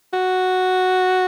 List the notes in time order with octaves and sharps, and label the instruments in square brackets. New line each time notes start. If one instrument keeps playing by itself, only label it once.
[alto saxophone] F#4